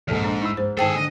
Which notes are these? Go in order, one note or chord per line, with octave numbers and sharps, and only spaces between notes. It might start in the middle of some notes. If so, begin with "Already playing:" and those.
A#1 E2 G#2 A4 F6
D4 D#5
D#4 E4 B5 E6
G#2 C5
G#2 D#3 G#4 A4 C5 G5 A5
D3 D#5 A#6